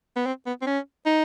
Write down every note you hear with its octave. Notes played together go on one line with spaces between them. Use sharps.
B3
C4
B3
C4
C#4
D#4